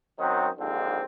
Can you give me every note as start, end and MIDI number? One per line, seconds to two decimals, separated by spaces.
0.19 0.49 42
0.19 0.49 51
0.19 0.49 54
0.19 0.49 60
0.19 0.49 63
0.59 1.03 39
0.59 1.03 44
0.59 1.03 50
0.59 1.03 53
0.59 1.03 60